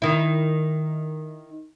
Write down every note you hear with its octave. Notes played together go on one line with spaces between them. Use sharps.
D#3 E4